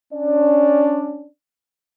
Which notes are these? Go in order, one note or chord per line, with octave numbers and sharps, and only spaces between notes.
C#4 D4 D5